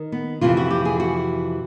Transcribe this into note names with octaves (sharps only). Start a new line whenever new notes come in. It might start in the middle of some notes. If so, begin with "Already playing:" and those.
Already playing: D#3
B3
F2 C3 E3 F4
F#4
G4
G#4
F#4